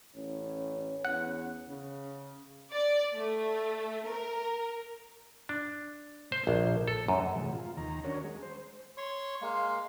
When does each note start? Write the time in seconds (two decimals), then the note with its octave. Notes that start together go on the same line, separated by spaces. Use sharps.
0.16 A1 C#4
1.05 E2 F#5
1.69 C#3
2.74 D5
3.16 A3
4.09 A#4
5.49 D4
6.32 C5
6.47 A#1
6.88 A4
7.08 F#2
7.35 A2 C3 E3 F#3 G#3
7.53 F4
7.77 D#2 D#3 A#5
8.04 C#4 D4 F#4 A#4 C#5
8.24 G#3
8.42 C5
8.97 C#5 C6 C#6
9.42 G#3 A#3 F5 C6